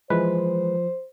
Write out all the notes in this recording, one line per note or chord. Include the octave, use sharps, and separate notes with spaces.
E3 F3 G#3 B4 C5